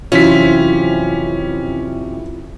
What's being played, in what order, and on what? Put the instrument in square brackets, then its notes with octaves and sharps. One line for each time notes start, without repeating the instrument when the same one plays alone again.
[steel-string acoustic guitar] F2 C3 [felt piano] E3 F#3 [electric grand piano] C#4 B6 [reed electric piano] E4 F4